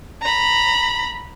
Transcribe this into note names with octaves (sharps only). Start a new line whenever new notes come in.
A#5 B5